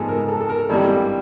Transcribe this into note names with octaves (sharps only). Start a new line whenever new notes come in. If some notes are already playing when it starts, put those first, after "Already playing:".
Already playing: G#2 F3 G#3 B3 A4
A#4
A4
A4
A#4
G#1 G2 E3 G3 A4